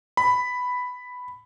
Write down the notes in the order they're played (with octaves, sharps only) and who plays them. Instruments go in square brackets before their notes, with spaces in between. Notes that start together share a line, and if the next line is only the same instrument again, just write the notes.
[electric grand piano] B5